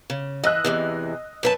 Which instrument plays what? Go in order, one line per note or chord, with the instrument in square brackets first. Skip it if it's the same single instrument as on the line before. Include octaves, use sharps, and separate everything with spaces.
[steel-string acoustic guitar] C#3
[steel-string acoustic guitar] E3 [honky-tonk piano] D#5 E6 F#6
[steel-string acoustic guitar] E2 C3 E3
F#2 B4 A5